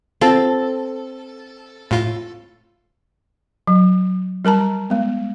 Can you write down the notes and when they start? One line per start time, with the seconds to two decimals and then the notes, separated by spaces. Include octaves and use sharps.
0.21 C4 F4 A4
1.91 A2 F4
3.67 F#3
4.45 G3 A#4 A5 A#5
4.90 G#3 B3